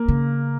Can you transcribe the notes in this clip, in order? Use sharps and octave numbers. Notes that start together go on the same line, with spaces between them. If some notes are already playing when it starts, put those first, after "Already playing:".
Already playing: A#3
C#3